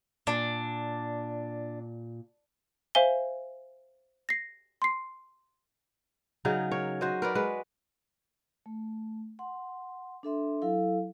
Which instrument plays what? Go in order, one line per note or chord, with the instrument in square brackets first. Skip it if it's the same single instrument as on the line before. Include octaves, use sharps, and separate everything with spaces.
[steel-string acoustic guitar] A#2 [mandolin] D4
[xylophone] C5 E5 F5 G#5 G7
A#6 C7
C6 C7
[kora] C#3 F#3 D#4
A#4 C#5
F#4 C5 D#5
A#4 B4 D5
G#3 B4
[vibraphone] A3
F#5 C6
D4 A4 E5 C6
F#3 E4 A4 F5